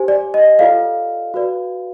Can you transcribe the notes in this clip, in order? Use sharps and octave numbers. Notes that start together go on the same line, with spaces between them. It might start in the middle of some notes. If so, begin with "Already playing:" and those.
Already playing: G4 C5 G#5
D5
D#5
F4 A4 D5 F5
F#4 B4 D5